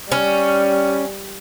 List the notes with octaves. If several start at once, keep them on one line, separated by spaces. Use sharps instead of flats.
G3 C#4